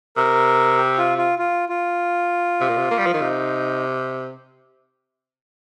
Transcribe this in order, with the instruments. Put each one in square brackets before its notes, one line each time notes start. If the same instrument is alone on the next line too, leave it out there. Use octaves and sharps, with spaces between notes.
[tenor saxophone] C3 [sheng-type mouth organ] A#4
[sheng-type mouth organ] G4
F4
F4
F4
F4
[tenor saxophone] C3
A#2
C3
A#3
G3
F3
D#3
[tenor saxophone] C3 [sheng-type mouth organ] D#4